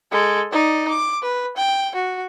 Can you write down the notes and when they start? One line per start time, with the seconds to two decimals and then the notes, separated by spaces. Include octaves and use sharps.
0.12 G#3 A4
0.52 D#4 D5
0.89 D6
1.22 B4
1.57 G5
1.95 F#4